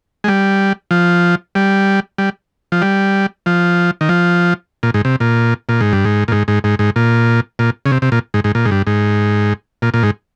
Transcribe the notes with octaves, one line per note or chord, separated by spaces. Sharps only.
G#3
G3
F3
G3
G3
F3
G3
F3
D#3
F3
A#2
G#2
C3
A#2
A#2
G#2
G2
G#2
A#2
G#2
G#2
G#2
G#2
A#2
A#2
C#3
C3
C3
A#2
G#2
G#2
A#2
G#2
G2
G#2
A#2
A#2
G#2